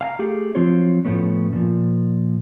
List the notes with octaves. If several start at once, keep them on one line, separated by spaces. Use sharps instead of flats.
F5 G#5 A#5
A3 G4 G#4
F3 F#3 C4 F4 C5 C#5
A2 F3 A3 B3 C#4
A#2 F3